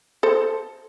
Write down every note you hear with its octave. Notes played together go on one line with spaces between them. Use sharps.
A4 C5